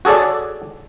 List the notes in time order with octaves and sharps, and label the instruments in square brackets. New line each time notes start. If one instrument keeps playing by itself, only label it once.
[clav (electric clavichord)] F#4 G#4 A4 C#5 D5